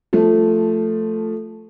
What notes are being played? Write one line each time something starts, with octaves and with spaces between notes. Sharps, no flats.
F3 A3